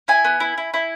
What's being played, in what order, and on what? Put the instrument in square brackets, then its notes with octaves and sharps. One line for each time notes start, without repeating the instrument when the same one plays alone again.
[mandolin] E4 G#5
B3
E4
E4
E4